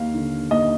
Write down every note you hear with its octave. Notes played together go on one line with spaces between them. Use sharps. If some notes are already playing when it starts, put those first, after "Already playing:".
Already playing: D#2 F5
D3
D#2 D#5